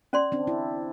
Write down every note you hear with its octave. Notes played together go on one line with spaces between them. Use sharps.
C#4 D5 C6
C4 D4
E4